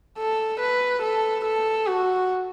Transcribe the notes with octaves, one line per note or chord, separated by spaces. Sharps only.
A4
B4
A4
A4
F#4